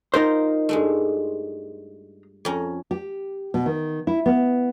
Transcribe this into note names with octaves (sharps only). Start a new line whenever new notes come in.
D#4 F4 A#4 C5
G2 G#3 A3
F2 C#4 A#5
G4
B2
D#3
E4
B3